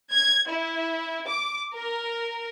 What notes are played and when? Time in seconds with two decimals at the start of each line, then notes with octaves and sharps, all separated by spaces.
0.13 G#6
0.49 E4
1.28 D6
1.74 A#4